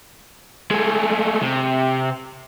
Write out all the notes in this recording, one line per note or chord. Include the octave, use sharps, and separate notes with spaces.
G#3 A3
C3